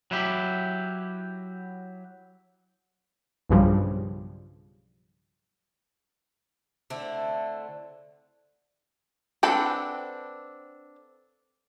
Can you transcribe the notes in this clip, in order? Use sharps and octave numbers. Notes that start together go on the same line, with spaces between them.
F#3 E4 G4
B1 G2 C#3 F3 G3
D3 A3 C4 E4
C4 D4 A4 B4 F#5